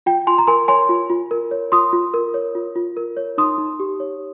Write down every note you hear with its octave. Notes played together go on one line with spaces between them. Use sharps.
F4 G5
F4 G#5 C6
A#5
A#4 G#5 C6
C#5 G#5 C6
F4
F4
A#4
C#5
F4 C6 D#6
F4
A#4
C#5
F4
F4
A#4
C#5
D#4 C6 D#6
D#4
G4
C#5